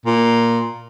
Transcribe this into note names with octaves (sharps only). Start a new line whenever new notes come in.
A#2